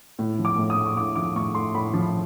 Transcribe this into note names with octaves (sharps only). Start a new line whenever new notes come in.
A2
F3
D6
A2
D#6
A3
C#6
A2 D6
F3 D6
A2 C#6
A3 C6
A2 B5
F3